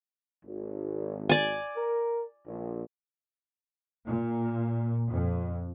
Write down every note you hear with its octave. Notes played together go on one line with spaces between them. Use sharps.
G#1
D5 G#5
A#4
A#1
A#2
F2